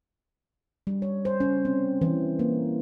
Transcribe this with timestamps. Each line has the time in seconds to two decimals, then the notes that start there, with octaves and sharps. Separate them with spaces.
0.87 G3
1.02 C#5
1.25 C5
1.40 C#4
1.65 C4
2.01 E3
2.39 A#3